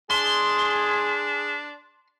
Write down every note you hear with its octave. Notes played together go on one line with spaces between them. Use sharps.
D4 G#4 C6